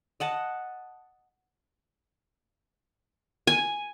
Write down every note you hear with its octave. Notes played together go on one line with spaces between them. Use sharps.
D#5 F#5 A5
G#5